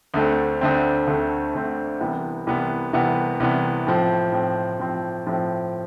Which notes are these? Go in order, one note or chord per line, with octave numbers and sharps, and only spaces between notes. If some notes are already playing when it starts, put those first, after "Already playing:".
D2 D3 A3 C4
D2 D3 A3 C4
D2 D3 A3 C4
D2 D3 A3 C4
C2 C3 E3 B3
C2 C3 E3 B3
C2 C3 E3 B3
C2 C3 E3 B3
A2 F3 C4
A2 F3 C4
A2 F3 C4
A2 F3 C4